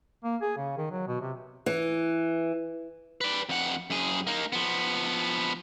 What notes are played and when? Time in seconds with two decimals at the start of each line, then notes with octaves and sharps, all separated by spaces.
0.24 A#3
0.42 G#4
0.57 C#3
0.78 D#3
0.91 F#3
1.08 B2
1.21 C3
1.66 E3
3.21 B4 D5
3.49 F2 F#5
3.90 F#2 G#4
4.27 A#3 D#4
4.53 F3 B3